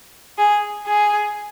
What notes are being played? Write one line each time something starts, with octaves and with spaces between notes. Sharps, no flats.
G#4
G#4